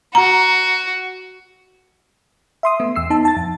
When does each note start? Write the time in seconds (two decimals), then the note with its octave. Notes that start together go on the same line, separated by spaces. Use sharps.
0.15 F#4 A#5
2.63 E5 C6 D#6
2.80 A3 B3
2.96 E2 E6 C7
3.10 B3 D#4 A5
3.25 A5 A6
3.37 F2